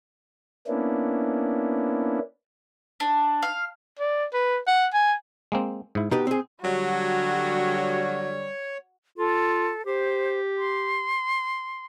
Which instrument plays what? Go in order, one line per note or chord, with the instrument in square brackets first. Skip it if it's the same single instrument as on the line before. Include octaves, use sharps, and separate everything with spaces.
[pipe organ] A#3 B3 C#4 D4 E4
[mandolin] D4
F5
[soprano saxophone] D5
B4
F#5
G#5
[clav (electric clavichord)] G#3 A#3 C4
G#2 E4
[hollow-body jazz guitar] B2 G4 B4 [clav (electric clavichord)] D#4
[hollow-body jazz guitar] C4 G#4
[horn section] D3 G3 [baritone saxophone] F#3 [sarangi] F#4 [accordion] C#5
[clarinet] F4 [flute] A4
[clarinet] G4 [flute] C5
[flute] C6